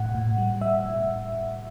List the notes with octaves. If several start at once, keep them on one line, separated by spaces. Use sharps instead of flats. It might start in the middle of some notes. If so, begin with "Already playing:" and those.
Already playing: A2 F#5
A2
G3
G3 E5
A2